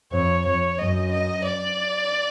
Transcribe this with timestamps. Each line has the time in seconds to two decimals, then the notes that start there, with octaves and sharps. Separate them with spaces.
0.12 F2 C#5
0.45 F2 C#5
0.79 F#2 D#5
1.12 D#5
1.46 D5